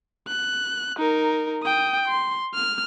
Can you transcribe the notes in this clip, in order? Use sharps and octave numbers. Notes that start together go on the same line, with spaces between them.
F#6
D#4 A#4
G5 D#6
C6
F6